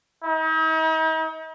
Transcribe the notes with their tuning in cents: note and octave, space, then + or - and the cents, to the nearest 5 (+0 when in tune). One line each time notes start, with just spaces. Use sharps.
D#4 +45